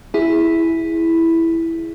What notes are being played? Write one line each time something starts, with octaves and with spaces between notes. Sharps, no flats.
E4 G#4